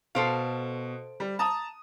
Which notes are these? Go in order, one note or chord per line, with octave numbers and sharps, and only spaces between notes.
B2 A4 C5 F5 D7
G3
A5 A#5 D#6